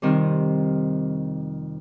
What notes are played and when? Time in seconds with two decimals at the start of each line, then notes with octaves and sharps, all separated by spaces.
0.02 F2 C3 D#3 G3